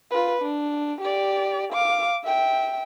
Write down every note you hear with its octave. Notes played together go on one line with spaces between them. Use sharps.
F4 B4
D4
G4 D5
F5 D6
E5 G5